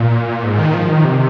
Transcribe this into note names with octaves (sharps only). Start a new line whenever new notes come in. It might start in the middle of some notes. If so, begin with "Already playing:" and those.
Already playing: A#2
G#2
D#3
F3
D#3
C3